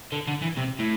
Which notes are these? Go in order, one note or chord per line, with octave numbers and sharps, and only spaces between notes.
D3
D3
E3
C3
A2